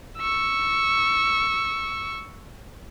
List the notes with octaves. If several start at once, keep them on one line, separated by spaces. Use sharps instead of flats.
C#6 E6